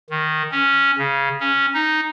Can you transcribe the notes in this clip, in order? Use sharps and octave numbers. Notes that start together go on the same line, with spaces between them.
D#3
C#4
C#3
C#4
D#4